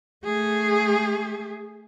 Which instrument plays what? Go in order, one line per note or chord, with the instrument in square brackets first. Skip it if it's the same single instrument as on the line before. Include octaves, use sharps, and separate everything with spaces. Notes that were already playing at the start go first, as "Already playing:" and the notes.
[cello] A3 G#4